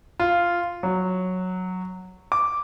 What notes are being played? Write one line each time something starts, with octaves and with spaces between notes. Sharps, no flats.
F4
F#3
D6